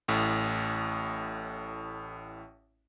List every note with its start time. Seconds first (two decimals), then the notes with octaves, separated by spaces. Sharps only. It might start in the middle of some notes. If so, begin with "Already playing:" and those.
0.08 A1 A2